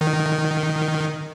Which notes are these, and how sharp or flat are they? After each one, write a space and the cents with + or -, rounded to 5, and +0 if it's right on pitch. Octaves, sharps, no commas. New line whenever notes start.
D#3 -5